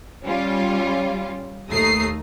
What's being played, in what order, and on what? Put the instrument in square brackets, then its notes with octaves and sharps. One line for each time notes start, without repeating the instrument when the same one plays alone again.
[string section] G3 C#4 F4
D#2 A3 A#5 D#6 C7